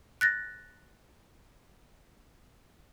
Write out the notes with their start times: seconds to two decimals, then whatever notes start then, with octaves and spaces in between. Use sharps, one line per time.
0.21 F#6 A6 A#6